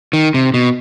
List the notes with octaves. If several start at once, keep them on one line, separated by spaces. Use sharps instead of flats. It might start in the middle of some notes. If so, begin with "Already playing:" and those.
D#3
C3
B2